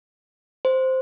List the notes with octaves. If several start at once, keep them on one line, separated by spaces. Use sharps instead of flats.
C5